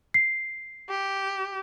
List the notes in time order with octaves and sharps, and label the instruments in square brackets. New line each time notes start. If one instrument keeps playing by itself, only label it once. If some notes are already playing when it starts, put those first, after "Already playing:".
[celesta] C7
[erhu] G4